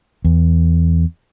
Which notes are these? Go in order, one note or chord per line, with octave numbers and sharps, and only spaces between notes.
E2